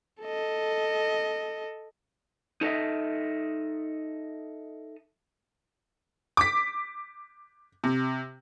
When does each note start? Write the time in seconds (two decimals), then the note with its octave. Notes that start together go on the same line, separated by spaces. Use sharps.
0.23 A4 D#5
2.61 D#4 A4 C5 D#5 E5
6.37 D6 B6
7.84 C3